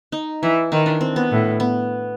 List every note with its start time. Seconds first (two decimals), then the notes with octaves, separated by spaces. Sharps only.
0.12 D#4
0.43 E3 E4
0.72 D#3 D#4
0.86 D4
1.01 C4
1.16 B3
1.31 A2
1.60 B3